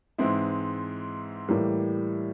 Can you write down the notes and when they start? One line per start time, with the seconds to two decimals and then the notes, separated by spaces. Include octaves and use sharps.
0.18 G#2 E3 G#3 C4 E4
1.48 A2 E3 G3 A#3